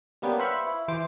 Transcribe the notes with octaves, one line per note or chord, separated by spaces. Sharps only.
G3 A#3 B3 C#4 D4 G4
B4 C5 E5 F5 B5 C#6
E4
E3 C5 D6